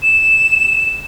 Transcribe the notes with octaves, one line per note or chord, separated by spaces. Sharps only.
E7